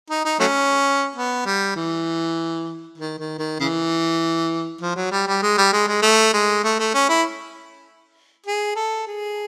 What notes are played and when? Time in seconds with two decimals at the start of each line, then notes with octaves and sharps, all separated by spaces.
0.10 D#4
0.25 D#4
0.40 F#3 A3 C#4
1.16 B3
1.46 G3
1.76 E3
2.98 D#3
3.19 D#3
3.39 D#3
3.60 C#3 E3
4.81 F3
4.96 F#3
5.11 G3
5.27 G3
5.42 G#3
5.57 G3
5.73 G#3
5.87 G#3
6.02 A3
6.33 G#3
6.64 A3
6.79 A3
6.94 C#4
7.09 E4
8.46 G#4
8.76 A4
9.07 G#4